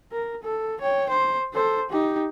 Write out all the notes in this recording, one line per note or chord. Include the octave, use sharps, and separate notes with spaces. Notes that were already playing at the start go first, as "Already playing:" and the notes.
A#4
A4
C#5 G5
C5
A4 C5
D#4 G4